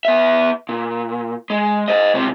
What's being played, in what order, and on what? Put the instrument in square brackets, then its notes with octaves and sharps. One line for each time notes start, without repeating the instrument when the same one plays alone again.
[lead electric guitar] B3 E5
A#2
G#3
C5 D#5
C#2 C3